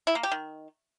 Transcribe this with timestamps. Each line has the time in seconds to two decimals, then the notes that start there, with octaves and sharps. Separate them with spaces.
0.07 E4
0.15 A#3
0.23 G4
0.32 D#3